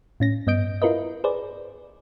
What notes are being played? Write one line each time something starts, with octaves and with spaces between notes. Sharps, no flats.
A2 C#4 A#6
G2 B3 D#5 G6 D7
E4 F4 A#4 B4 D#5
G#4 B4 C5 D5